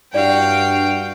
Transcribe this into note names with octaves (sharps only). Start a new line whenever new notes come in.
G2 E4 F#4 D5 F5 G5